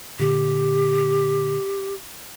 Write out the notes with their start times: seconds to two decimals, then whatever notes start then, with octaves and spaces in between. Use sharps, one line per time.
0.19 A#2 D3 G4